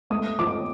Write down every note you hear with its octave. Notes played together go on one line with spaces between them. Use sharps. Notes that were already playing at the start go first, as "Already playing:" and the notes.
A3 D#6
F3 D6